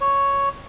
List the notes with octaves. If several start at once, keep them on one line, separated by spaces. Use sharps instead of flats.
C#5